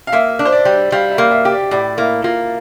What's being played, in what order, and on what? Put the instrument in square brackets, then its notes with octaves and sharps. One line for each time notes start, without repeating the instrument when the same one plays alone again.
[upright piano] F5
[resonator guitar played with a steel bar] A#3 [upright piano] E5
[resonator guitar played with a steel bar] D4
[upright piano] C5
D5
[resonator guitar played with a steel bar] G3
[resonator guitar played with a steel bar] G3 [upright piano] F5
[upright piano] E5
[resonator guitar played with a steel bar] A#3
[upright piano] E5
[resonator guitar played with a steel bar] G4
[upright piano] D5
[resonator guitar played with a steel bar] A2 [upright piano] D5
[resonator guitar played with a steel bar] A#3 [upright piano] E4
[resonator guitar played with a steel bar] A#3 [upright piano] F4